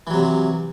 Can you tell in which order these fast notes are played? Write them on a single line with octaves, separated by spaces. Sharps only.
E3 F#3 C3